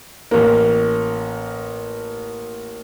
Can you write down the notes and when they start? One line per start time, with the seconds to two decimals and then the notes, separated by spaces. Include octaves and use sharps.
0.31 A1 A#3